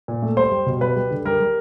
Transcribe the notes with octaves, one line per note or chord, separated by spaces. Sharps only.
A#2
A3
G3 C5
G3
B2
G3 B4
G3
D3
G3 A#4
G3